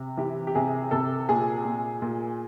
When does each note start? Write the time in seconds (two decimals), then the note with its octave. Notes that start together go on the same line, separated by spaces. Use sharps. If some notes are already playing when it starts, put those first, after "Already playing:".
Already playing: C3
0.17 E3 G4
0.47 G4
0.55 C3 G#4
0.91 C3 A4
1.29 A#2 G#4
1.65 A#2
2.02 A#2